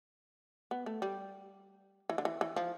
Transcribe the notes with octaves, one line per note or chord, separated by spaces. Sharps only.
B3
A3
G3
E3
D3
E3
E3
F3